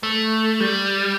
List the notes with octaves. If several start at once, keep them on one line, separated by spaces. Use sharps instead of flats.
A3
G3